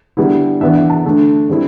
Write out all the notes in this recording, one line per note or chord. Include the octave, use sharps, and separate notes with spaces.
D3 G3 B3 E4
E3 B3 D4 E5
E5
A5
D3 A3 D4
D3 G3 C4 E4